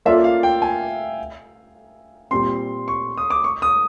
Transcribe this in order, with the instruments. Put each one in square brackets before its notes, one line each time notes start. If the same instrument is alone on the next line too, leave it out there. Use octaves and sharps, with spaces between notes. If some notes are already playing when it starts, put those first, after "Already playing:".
[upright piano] A#3 C#4 F4 A4 D5 [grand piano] E5
[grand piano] F5
G5
G#5
[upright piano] A#2 G3 C4 [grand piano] C6
[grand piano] C#6
D#6
D6
C#6
D#6